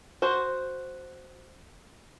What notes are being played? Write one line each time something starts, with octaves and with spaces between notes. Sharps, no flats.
F#4 C5